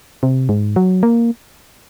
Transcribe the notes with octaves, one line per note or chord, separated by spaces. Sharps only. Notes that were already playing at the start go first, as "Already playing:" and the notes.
C3
G#2
F#3
A#3